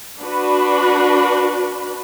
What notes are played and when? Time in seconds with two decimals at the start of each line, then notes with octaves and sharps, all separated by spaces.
0.21 D4 F#4 B4